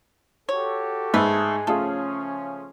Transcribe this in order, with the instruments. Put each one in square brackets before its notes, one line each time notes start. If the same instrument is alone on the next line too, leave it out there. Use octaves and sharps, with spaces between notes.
[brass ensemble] F#4 G4 A4 [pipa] C#5
[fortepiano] G#2 E6 [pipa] A3 B4 [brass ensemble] G#4
[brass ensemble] C#3 F3 C#4 [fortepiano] A3 F4 G#4 [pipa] A4